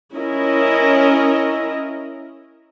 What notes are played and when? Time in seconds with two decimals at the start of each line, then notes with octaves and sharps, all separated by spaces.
0.15 C#4 E4 A#4 D#5